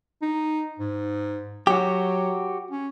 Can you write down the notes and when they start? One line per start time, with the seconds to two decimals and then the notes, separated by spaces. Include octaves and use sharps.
0.22 D#4
0.79 G#2
1.67 F#3 F#4 G4
2.71 C#4